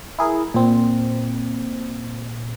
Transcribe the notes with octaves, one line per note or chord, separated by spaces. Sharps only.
E4 G#4 A#4
A#2 C4